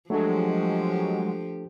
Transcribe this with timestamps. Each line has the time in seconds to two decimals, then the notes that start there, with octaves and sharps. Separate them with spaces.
0.10 F3 F#3 G#3 A3 D4 G4 A4